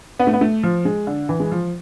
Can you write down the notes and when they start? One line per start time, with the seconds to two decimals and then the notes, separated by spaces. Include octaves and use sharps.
0.19 B3
0.27 A3
0.33 B3
0.41 A3
0.63 F3
0.85 G#3
1.07 D3
1.29 E3
1.40 G#3
1.51 F3